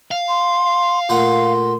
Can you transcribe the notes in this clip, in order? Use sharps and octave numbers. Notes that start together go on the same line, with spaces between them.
F5
C6
A#2 A3 F#5 C6